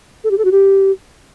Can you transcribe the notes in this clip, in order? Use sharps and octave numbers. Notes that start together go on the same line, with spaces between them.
A4
G4
A4
F#4
G4